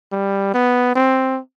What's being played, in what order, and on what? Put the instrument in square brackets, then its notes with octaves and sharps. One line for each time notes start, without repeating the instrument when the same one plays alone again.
[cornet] G3
B3
C4